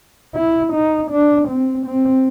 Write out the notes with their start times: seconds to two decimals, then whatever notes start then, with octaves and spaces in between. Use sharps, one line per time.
0.35 E4
0.73 D#4
1.11 D4
1.48 C4
1.87 C4